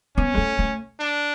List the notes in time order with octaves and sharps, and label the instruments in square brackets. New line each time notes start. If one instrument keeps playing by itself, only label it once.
[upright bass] B3 [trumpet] C#4
[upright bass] G#3
A3
A3
[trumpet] D4